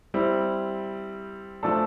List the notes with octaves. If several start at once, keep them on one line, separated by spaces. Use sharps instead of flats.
G3 C4 E4
F3 A3 D4 A4